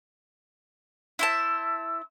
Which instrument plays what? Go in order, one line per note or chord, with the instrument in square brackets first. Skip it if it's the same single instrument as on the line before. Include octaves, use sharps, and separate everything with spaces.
[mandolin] E4 C5 A5 [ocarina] E6